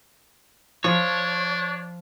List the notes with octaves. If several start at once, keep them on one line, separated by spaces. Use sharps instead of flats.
F3 D4 C#5